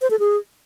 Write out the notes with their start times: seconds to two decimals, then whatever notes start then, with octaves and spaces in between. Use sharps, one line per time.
0.02 C5
0.10 A4
0.19 G#4